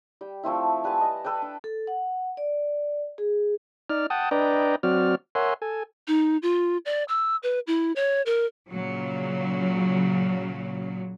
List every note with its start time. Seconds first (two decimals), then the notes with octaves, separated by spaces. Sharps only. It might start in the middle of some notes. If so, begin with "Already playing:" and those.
0.21 G3 G5
0.43 F3 A3 C4 E4
0.84 G3 B4 G#5 A5
1.01 D#5 A5
1.24 A4 B4 D5 G5
1.42 D4
1.64 A4
1.87 F#5
2.37 D5
3.18 G#4
3.90 D#4 D5 F6
4.10 F#5 G5 A5 D#6
4.31 D4 B4 D5 D#5 G5 A#5
4.83 F#3 C4 F#4 D5 F6
5.35 A#4 C#5 E5 F#5 G#5 C6
5.62 A4 G#5
6.08 D#4
6.42 F4
6.86 D5
7.08 E6
7.43 B4
7.67 E4
7.96 C#5
8.26 A#4
8.70 A#2 C#3 F#3